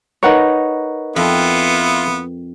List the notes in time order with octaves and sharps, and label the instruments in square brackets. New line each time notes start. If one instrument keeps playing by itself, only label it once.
[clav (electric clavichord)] D#4 C#5 [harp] A#4 B4 F#5
[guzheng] F2 [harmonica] B3 E4 F4